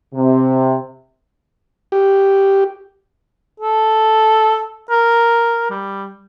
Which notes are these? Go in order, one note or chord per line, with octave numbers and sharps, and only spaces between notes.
C3
G4
A4
A#4
G3